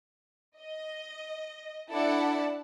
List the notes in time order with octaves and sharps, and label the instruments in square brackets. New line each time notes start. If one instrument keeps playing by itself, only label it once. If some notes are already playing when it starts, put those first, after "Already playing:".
[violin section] D#5
D4 E4 A4 D5 F#5 A5